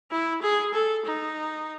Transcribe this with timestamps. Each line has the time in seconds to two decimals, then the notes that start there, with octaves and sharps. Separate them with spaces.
0.11 E4
0.42 G#4
0.74 A4
1.05 D#4